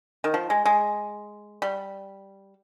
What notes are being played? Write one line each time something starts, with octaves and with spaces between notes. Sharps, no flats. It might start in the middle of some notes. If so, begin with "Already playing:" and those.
D#3
F3
G#3
G#3
G3